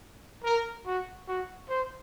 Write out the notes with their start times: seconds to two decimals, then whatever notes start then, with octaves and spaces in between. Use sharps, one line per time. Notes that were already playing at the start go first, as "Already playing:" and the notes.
0.44 A#4
0.86 F#4
1.28 F#4
1.69 C5